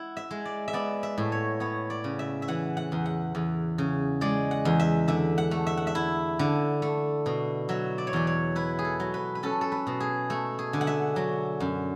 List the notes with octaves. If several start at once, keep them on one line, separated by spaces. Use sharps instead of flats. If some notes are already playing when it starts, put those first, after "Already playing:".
Already playing: E4 F#5
E5
G#3
D5
E5
B3 D5
E5
A2
C#5
B3 C#5
D5
C#3
E5
E5
E3 F#5
F#5
E2
F#5
E2
C#3
G#3 D5
F#5
E2
E5
D3 E5
F#5
A3
E5
F#5
E5
E4
D3
A3
B2
F#3 E5
D5
C#5
E2 D5
C#5
E4 B4
G#4
A4
F#3
B4
B4
C#4 A4
A4
B4
B2
G#4
A3
G#4
D3
F#5
E5
F#3
F#2